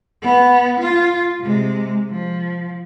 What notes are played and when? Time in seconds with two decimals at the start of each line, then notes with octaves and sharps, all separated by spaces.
0.22 B3
0.80 F4
1.40 C3 G#3
2.10 F3